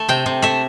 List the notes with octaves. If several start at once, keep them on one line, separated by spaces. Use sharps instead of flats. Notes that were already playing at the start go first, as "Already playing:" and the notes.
Already playing: A3
C3 G5
C3
A3 E5